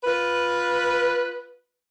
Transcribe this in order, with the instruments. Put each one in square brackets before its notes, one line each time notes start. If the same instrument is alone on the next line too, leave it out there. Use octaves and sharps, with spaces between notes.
[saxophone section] F4 B4